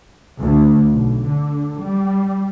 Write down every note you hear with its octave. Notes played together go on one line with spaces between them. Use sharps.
D2
B1
D3
G3